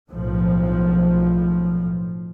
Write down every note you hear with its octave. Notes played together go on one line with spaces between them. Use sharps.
B1 A2 F3